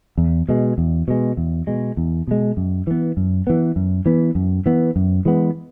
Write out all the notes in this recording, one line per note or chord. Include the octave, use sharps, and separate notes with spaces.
E2
B2 G#3
E2
B2 G#3
E2
B2 G#3
E2
B2 G#3
F#2
E3 B3
F#2
E3 B3
F#2
E3 B3
F#2
E3 B3
F#2
E3 G#3 B3